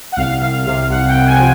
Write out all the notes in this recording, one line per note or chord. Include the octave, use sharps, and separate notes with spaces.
F#5
C2 F5
C2 F5
C3 F5
C2 F#5
G5
C2
G#5
F3